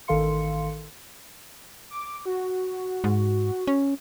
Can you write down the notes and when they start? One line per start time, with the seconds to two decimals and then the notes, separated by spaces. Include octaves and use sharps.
0.08 A1 D#3 A4 F5 C6 C#7
1.91 D6
2.26 F#4
3.04 G#2
3.67 C#4